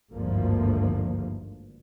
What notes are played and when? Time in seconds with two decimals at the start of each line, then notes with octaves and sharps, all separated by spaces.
0.12 G#1 D2 G2 D3 F3 A#3